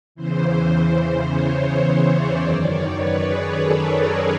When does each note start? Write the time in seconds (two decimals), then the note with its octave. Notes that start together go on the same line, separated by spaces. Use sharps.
0.15 E2 C#3 E3 C5
1.28 C#5
1.84 C#5
2.12 D5
2.40 F#2 D#3 D5
2.69 C#5
2.96 B4
3.24 G#4
3.53 A4
3.81 A#4